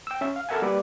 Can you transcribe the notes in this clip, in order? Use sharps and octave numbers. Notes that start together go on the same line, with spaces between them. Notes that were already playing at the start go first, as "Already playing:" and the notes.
G5 E6
C#4 E5
F5
A4 A#4 E5 F#5 G#5
G3 A#3 B4 D5